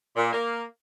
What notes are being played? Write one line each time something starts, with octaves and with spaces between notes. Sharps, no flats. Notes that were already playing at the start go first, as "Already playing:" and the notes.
A#2
A#3